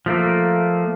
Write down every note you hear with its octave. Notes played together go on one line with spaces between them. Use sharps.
F3 A3 A#3